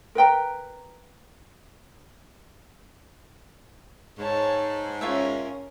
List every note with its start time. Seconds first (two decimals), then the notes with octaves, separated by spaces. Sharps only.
0.15 A#4 B4 G5 A#5
4.18 G#2 C#5 A5
5.01 C#4 F4 A#4 C#5 E5